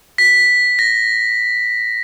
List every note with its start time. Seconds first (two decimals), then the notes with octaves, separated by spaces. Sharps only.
0.18 B6
0.79 A#6